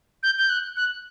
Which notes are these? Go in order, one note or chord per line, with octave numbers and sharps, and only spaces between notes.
G6
G6
F#6
F#6